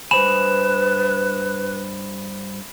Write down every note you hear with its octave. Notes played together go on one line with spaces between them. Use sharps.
G2 B4 C5 G#5 B5 E7